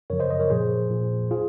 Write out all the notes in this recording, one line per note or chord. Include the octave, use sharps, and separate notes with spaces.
F#2 C#3 F3 A#4 C#5
C5 D#5
C5 D#5
A#4 C#5
A#2 F3 G#4 C5
A#2 F3
F4 G#4